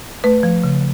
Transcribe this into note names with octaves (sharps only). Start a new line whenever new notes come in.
A3 B4
F3
C#3